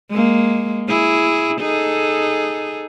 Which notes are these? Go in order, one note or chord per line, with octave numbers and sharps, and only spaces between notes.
G#3 A#3
E4 G#4
D#4 G#4 A4